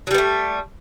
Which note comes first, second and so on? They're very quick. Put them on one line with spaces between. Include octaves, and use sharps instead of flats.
F#3 G3 B3 A3